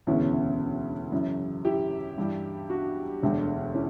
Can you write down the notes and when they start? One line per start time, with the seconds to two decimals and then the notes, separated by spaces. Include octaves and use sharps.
0.07 E1 D2 C#3 E3 B3 C#4 E4
1.12 F#2 C#3 E3
1.65 E4 G4
2.18 G2 E3 G3
2.69 D4 F#4
3.22 E1 D2 D3 G3
3.74 C#4 E4